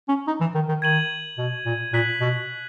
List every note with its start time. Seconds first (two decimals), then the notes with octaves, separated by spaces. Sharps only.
0.09 C#4
0.27 D#4
0.41 E3
0.55 D#3
0.69 D#3
0.82 D#3 G#6 D#7 F#7
1.38 B2
1.66 A#2
1.93 A#2 F#6 B6 F#7
2.21 B2